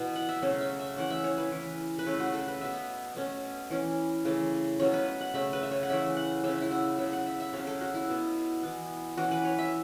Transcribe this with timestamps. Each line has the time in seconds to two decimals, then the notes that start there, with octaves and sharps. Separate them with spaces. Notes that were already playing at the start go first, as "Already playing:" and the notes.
Already playing: B2 E3 B3
0.16 F#5
0.29 E5
0.42 C#3 F#3 A3 C#4 C#5
0.61 E5
0.79 E5
0.97 E3 A3 C#4 F#5
1.10 E5
1.24 C#5
1.38 B4
1.52 E3 C#4
1.99 B4
2.06 C#3 A3 C#4 A4
2.20 F#4
2.34 A4
2.48 B4
2.61 B2 B3 E5
3.16 B2 A3 C#4
3.70 E3 C#4
4.25 C#3 E3 A3
4.80 B2 F#3 A3 C#4 C#5
4.94 B4
5.21 F#5
5.34 C#3 A3 C#4 E5
5.53 B4
5.63 E5
5.71 C#5
5.83 F#5
5.89 E3 A3 C#4 E5
6.17 F#5
6.43 C#3 A3 C#4 E5
6.61 E4
6.71 F#4
6.98 C#3 F#3 B3 E5
7.13 F#5
7.26 E5
7.40 E5
7.53 C#3 F#3 C#4 C#5
7.67 A4
7.81 F#4
7.94 E4
8.08 B2 B3
8.63 E3 B3
9.17 E3 C#4 F#4
9.31 B4
9.45 C#5
9.58 E5